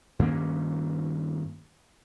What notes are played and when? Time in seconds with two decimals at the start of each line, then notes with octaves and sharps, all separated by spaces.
0.19 G2 D#3 A#3 C#4